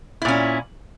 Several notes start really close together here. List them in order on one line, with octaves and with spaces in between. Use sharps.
E4 A#2 C#4